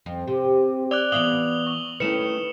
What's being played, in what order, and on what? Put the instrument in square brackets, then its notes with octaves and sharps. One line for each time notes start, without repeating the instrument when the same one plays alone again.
[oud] F2
[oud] C3 [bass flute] G4
[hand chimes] D5 D6 F#6 [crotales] E6 F7 G7
[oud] E3 E5 F5 [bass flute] B3 [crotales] D#6 F#7 G7
[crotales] C#6
[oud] D#3 A3 C#4 [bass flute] E4 [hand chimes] B4 [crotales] C#7 E7